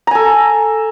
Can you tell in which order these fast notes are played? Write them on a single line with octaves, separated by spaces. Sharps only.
A#5 G#5 A4